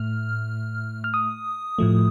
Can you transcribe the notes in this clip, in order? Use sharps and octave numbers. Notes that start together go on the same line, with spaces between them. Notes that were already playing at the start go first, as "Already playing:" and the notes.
Already playing: A2 A3 F6
F6
D#6
A2 F3 A3